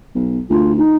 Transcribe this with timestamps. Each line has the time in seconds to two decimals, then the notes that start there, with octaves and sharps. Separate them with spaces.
0.15 B1
0.50 D2 F4
0.77 D#4